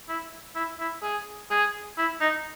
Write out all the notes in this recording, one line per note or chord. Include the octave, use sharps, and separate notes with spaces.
E4
E4
E4
G#4
G#4
E4
D#4